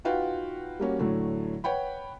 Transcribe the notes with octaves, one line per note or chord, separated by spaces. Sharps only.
D#4 F4 F#4 B4 F5 G5
G3 A#3 C#4 F#4
A2 D3 F#3 A3
B4 C#5 F#5 G5 B5